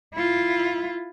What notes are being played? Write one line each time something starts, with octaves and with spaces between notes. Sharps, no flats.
E4 F4